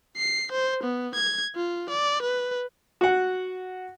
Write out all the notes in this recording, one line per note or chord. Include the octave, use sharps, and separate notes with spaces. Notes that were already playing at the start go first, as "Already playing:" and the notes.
C7
C5
B3
G#6
F4
D5
B4
F#4 F#5